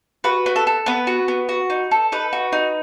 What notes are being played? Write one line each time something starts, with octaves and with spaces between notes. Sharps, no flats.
F#4 B4
B3
A4
A4
B3 B4
F#4
B3
F#4
D#4
A4
D#4 B4
F#4
D#4